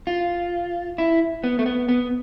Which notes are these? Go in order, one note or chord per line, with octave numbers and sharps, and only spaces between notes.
F4
E4
B3
A3
B3
B3